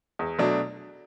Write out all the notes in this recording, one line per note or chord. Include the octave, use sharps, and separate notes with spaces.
E2
B2 F#3 A3 D4